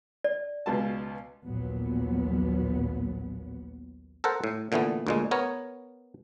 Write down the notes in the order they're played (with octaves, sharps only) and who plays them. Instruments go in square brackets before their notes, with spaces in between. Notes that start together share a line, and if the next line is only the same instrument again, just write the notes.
[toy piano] D5
[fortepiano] C#2 B2 A5
[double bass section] A#1 D#2 A#2 F#3 B3
[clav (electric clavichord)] A4 A#4 C5 F#5
A2
A#2 D3 E3 A3 B3
D2 A#2 G#3
B3 A#4 C#5